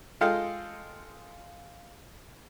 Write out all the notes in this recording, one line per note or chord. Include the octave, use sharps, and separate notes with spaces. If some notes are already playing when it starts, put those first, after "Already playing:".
G#3 F4 A4 D#5 F5 G5